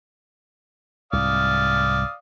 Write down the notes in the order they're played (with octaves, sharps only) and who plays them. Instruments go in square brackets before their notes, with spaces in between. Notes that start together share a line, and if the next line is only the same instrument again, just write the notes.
[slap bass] C2 G#2 [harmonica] D5 F5 D#6